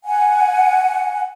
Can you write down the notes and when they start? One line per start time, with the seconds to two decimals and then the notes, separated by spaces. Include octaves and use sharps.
0.04 F#5 G#5